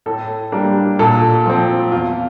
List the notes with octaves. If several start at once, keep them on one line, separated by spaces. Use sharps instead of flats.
A2 A4
G3 A#3 D4
A#2 A4
F3 C4
E2 F4